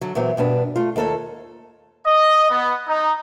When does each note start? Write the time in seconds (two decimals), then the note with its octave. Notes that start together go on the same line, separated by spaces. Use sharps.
0.01 D3 F#3
0.15 A#2 E3 F#3 B3 C4
0.37 G2 B2 D4 B4
0.76 A3 F4
0.96 D#2 A#3 A4 C5 C#5
2.07 D#5
2.50 B3
2.88 D#4